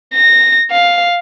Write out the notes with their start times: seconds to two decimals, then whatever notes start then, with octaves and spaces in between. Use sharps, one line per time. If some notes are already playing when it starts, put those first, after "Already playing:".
0.14 A#6
0.71 F5